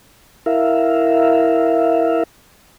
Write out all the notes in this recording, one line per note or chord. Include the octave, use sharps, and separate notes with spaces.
E4 A#4 E5 F5